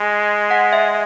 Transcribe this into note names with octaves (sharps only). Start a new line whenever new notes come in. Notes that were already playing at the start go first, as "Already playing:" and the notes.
Already playing: G#3
F#5
E5